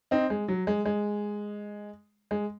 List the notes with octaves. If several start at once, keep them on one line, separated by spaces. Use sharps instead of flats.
C4 D#4
G#3
F#3
G#3
G#3
G#3